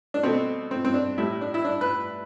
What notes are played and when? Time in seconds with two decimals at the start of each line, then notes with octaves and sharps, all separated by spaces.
0.14 D4
0.23 B2 A3 C4
0.71 C4
0.85 C4
0.94 D4
1.18 A2 G3 E4
1.41 D4
1.54 E4
1.65 D4
1.81 B4